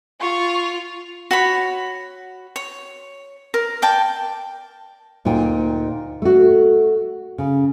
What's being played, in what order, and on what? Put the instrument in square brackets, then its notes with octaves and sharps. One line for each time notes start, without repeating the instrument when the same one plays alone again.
[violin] F4 [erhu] C#6
[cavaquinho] F#4 C#5 B5
C#5
A#4
D5 G5 A5
[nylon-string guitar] D2 A#2 D#4 G5
A3 F#4
C#3